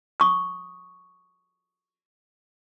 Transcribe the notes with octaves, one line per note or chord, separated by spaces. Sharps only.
C#6 D#6